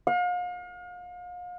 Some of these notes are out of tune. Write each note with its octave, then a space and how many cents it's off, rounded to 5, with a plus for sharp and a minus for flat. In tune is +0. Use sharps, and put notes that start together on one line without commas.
F5 +40